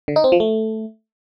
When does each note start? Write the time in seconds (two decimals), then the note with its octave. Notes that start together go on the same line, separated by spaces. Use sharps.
0.08 D3
0.16 D#4
0.24 C4
0.32 F3
0.40 A3